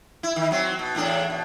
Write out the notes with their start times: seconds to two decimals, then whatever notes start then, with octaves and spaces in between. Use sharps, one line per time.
0.23 E4
0.36 D#3
0.51 F#3 C4
0.79 B2
0.95 E2 A2 D4
1.30 B2